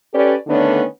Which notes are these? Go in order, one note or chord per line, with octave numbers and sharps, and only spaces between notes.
C#4 G4 A4 B4 D5
D3 D#3 A3 B3 C#4 D4